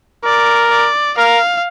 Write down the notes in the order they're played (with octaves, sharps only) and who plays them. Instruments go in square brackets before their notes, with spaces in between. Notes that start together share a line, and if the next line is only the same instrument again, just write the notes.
[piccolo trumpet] A#4 [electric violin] D5
[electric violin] D5
[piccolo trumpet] A#4 [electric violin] F5